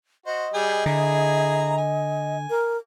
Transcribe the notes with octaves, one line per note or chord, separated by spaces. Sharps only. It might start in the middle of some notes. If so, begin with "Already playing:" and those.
F#4 C5 D#5
G3 G#4 G5
D3 E4 G#4 A#5
G#5
A#4